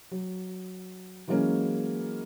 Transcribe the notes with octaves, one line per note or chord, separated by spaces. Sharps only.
F#3
E3 F#3 G#3 A#3 C#4